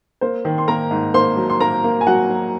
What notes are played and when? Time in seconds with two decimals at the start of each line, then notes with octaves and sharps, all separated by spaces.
0.21 A#3 C5
0.45 D#3
0.58 C6
0.68 A#3 A#4 A#5
0.91 G#2
1.14 A#3 C5 C6
1.37 F#3
1.50 C6
1.60 A#3 A#4 A#5
1.84 A#3
2.01 G#5
2.07 F#3 F#4 F#5
2.29 F#3